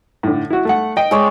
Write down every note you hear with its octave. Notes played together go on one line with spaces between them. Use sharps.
A2 D3
E4 F#4
A3 F#5
D#5 G5
G#3 C#5 D5